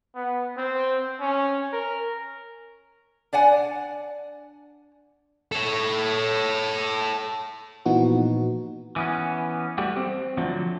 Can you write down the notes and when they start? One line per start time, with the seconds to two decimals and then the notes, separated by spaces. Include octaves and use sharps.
0.15 B3
0.57 C4
1.21 C#4
1.73 A#4
3.33 D4 D5 F#5 G#5
5.52 A4 C#5
7.86 A#2 E3 F3 B3 D#4 F#4
8.96 E3 B3 C#4
9.78 G3 A3 B3 F#4 G4
9.97 C4
10.37 D3 F3 F#3 A3